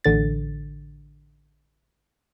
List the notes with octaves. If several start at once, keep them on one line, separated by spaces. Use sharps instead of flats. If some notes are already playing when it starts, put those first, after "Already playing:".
A1 D3 A6